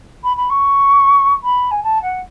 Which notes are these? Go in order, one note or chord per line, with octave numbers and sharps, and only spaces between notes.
B5
B5
C#6
B5
G#5
A5
F#5